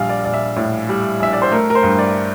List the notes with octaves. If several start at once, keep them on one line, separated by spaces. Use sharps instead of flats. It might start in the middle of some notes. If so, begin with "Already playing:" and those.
Already playing: A#1 G3 F5
D5
A#1 D5
E5
A2
G3
A#1 E5
D5
C5
A3 A#4
A#4
C5
G2
D5